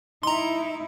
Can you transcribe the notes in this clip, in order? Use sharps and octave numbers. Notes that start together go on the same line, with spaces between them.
D#4 E4 A#5 C6